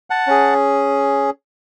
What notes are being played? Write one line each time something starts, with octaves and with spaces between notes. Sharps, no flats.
F#5 A5
C#4 G#4